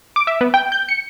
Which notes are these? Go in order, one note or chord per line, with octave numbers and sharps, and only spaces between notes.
D6
E5
B3
G5
G6
C#7